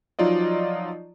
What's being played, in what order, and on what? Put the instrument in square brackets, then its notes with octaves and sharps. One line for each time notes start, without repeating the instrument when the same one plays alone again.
[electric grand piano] F3 F#3 D#4 F4 D5 D#5